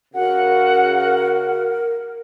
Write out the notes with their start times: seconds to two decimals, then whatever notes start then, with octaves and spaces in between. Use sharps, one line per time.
0.14 C#3 F#4 A#4 F#5